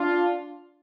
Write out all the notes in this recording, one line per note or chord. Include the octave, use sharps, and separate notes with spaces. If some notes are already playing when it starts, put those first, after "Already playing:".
Already playing: D4 F4